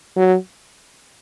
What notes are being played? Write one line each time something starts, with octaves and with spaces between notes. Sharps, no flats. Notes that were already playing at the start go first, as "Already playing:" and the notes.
F#3